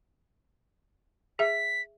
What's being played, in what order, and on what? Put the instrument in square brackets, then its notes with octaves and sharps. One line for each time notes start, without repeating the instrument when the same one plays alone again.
[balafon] G#4 E5 [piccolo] B6